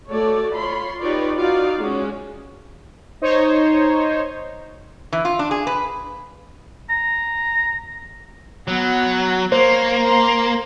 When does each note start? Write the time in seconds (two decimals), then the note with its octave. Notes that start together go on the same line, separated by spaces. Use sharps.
0.11 A3 F#4 A4 C#5 D5
0.56 F4 C#5 B5 C6
1.00 D#4 F4 G4 B4 C#5 D5
1.38 D#4 F4 F#4 D5 F5
1.80 G#3 C#4 F#4
3.22 D#4 C5 C#5
5.12 E3
5.25 F4
5.39 D4
5.51 G#4
5.67 B4
6.89 A#5
8.68 F#3 B3 F#5
9.52 A#3 C5 C#5 C6
10.05 A#5 C6